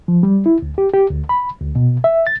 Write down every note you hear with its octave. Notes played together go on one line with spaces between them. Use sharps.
F3
G3
E4
D2
G4
G4
D2
B5
D2
B2
E5
A6